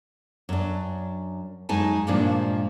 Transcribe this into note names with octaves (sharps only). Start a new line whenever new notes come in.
F#2 D4
F#2 G#3 D#4 G#5 A5
G2 A#2 F3 G#3 A#3 D4